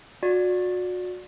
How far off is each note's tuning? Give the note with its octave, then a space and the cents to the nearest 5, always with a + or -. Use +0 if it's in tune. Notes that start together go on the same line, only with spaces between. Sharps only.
F#4 -35 D5 +0